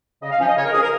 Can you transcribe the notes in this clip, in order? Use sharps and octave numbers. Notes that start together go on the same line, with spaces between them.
C#3 D#5
F5
F3 C#4
D#5
C#3 C#5
A#4
F3 C#4 G#4
A#4